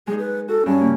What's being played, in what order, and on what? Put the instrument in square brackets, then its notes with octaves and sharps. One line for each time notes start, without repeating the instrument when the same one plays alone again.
[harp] G#3 D#4 [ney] G#4
[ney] B4
[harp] F#4 [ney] A4
[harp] G2 [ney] C#4
[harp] C#3 A#3